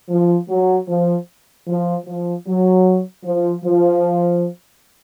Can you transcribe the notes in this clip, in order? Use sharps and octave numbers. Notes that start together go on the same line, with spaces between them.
F3
F#3
F3
F3
F3
F#3
F3
F3